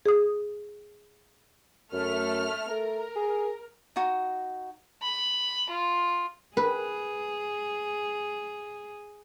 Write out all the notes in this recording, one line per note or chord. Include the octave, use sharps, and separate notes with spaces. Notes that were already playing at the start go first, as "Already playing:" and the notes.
G#4 D#6
F#2 A3 F6
A3 A#4
G#4
D#4 F#4
B5
F4
G#4 B4